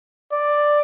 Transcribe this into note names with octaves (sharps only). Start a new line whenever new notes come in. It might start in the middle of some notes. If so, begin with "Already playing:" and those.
D5